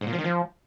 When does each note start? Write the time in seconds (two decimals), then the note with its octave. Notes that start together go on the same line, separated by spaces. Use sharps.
0.01 G#2
0.07 A#2
0.13 F3
0.18 D#3
0.24 F3